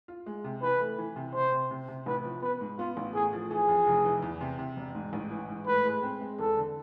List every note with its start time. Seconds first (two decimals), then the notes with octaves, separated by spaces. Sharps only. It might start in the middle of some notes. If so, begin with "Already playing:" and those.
0.08 F4
0.26 G#3
0.44 C3
0.62 E3 B4
0.80 A3
0.98 E3
1.16 C3
1.34 C3 C5
1.52 C3
1.71 C3
1.88 C3
2.06 A1 B4
2.24 F3
2.42 B3 B4
2.61 G#2
2.78 B3 F4
2.97 A1
3.14 A2 G#4
3.33 F3
3.51 E3 G#4
3.69 F2
3.87 F1
4.04 E3
4.23 E2
4.41 C3
4.59 C3
4.77 E1
4.95 G#2
5.13 A1
5.30 E3
5.49 G#2
5.67 A2 B4
5.85 G#3
6.03 C4
6.21 G#3
6.39 E2 A4
6.57 D3